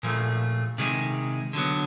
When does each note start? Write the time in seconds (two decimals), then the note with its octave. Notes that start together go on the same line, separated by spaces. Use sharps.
0.03 A#2 F3 A3
0.78 C3 D#3 G#3
1.53 D3 F#3 B3